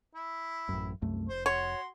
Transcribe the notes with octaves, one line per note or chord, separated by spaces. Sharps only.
E4
A1 F#2
C2 F#2 A3
F1 C5
F#4 C#5 C6